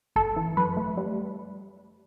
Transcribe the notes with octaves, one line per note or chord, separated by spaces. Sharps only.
G1 A4
E3
F#2 B4
A3
G3